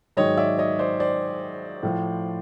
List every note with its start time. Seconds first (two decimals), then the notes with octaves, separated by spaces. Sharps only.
0.17 G#2 D#3 F#3 C#5 D#5
0.37 D5 E5
0.59 C#5 D#5
0.79 C5 D5
1.00 C5 D5
1.83 A2 F3